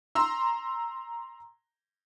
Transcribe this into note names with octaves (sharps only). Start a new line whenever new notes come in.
A#5 C6 E6